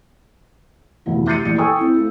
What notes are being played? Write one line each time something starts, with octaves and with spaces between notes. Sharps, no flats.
F1 D2 E3 F3 B3 E4
D6 G6 A6 C7 C#7 D#7
A#1 E3 C#7
A4 G5 G#5 C#6 D#6 E6
C4 E4
A3 F4